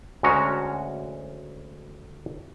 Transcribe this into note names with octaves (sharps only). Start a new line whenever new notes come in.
D2 G#3 C#4 F#4 A#5